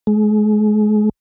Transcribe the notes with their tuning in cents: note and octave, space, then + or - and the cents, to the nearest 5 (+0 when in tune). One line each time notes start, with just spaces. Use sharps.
G#3 +35